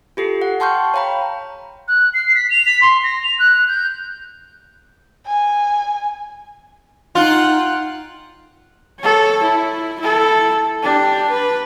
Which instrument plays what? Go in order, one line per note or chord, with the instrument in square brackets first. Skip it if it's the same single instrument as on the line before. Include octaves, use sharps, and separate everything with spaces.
[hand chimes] F4 G4 A4 C7
F#5
G5 A5 C6 C#6 F6 G6
C#5 F5 G5 A#5 B5
[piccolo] F#6
C7
B6
F7
B6
C6
A#6
F7
F#6
G6
[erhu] G#5
[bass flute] D#4 [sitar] F4 [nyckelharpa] F#5 G5
[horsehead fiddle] A4 C#5
E4
E4 A4
D4 G4
B4